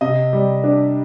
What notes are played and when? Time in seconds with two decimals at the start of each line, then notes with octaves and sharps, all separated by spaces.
0.01 C3 D#5
0.33 G3
0.64 D4